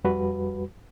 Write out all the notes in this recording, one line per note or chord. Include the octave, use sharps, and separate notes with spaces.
F2 G3 F#4 B4